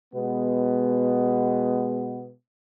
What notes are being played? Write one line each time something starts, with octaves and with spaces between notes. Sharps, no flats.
B2 G#3 B3